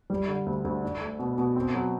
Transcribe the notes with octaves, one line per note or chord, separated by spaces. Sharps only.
G3
D3
D2
D2
D4
A3
B2
B2
C4
F#3